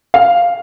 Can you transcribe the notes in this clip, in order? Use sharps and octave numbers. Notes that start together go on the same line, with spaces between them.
F5